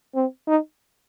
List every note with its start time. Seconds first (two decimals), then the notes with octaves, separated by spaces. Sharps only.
0.15 C4
0.48 D#4